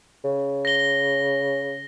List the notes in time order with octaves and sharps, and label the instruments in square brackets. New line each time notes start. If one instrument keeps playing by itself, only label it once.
[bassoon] C#3
[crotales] A#6 G7